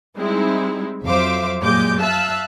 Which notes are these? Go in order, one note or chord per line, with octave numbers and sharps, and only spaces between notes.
G3 G#3 C4 D#4 E4
F2 F#3 C5 E5 F5 D6
F#2 A#2 G#3 G4 D6 G6
E5 F5 A5 E6 F#6